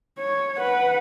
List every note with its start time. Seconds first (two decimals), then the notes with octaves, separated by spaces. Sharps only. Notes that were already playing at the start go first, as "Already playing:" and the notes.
0.19 C#5
0.58 B4 F#5